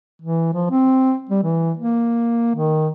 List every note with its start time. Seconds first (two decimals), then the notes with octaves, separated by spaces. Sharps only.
0.22 E3
0.53 F3
0.71 C4
1.29 G3
1.43 E3
1.77 A#3
2.55 D#3